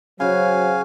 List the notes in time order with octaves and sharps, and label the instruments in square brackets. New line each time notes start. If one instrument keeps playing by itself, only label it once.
[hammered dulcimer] C#3 F#4 [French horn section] F#3 C5 [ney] C#5 [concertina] F5 G#5